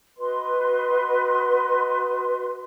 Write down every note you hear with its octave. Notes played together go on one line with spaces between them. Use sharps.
F#4 B4 D#5 C6